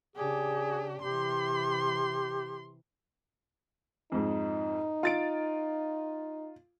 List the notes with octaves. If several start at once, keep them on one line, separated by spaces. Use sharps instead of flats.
C#3 D4 G4 G#4
C3 E3 G4 C6
F2 G#2 D#4
F4 A6 D7